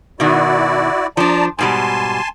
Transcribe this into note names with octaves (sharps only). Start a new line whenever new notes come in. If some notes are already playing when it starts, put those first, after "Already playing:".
B2 D#3 E4 F#4 D5
F3 D4 D5 A5 A#5
G#2 B2 G3 G#5 A5 C6